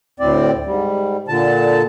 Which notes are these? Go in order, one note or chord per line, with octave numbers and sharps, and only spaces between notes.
D2 A2 C4 D5
G#2 G3
A#2 D3 A5